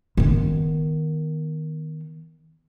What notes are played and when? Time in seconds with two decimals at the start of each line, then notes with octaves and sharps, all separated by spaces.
0.17 D#3 B3